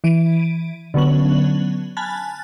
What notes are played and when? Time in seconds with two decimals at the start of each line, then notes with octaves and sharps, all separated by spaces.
0.04 E3 D7 D#7
0.94 D3 F#3 B3 C#4 F#7
1.97 G#5 A5 B5 F6 F#6 A6